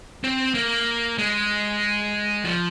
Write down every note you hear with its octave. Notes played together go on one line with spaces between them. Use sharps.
C4
A#3
G#3
F3